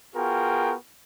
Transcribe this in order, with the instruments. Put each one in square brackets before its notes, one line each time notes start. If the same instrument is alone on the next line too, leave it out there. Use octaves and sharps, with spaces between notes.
[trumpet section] B3 F4 F#4 G#4 A#4 G5